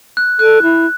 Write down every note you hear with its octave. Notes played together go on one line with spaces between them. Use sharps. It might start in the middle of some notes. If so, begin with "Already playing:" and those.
F#6
A4 F#6
E4